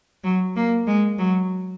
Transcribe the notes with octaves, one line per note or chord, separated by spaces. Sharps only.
F#3
A#3
G#3
F#3